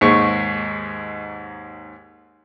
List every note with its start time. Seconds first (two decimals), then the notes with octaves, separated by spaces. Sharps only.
0.01 D#2 G#2 C#6